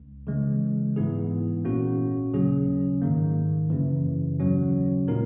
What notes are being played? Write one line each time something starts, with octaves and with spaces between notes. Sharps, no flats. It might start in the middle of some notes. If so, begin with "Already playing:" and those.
Already playing: C#2
C#3 E3 G#3
G#2 E3 B3 E4 G#4
A#1 A#2 A#3 C#4 F#4
D#2 C#3 F#3 C#4 G#4
G#2 D#3 A#3
F#2 C#3 E3
D#2 C#3 F#3 C#4 F#4
A#2 G#3 B3 D#4 A#4